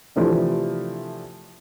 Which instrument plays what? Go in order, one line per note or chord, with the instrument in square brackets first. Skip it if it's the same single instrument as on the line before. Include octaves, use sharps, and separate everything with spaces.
[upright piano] C3 E3 F3 A3 D4